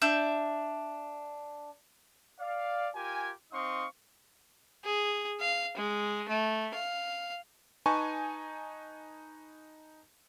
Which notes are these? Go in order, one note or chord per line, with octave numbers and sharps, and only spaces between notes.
D4 E5 G6
D5 F5
F4 G4 A#4 G#5
C4 D#4 F5 C6 C#6 D#6
G#4
F5
G#3
A3
F5
D#4 B4 G#5 A5 C#6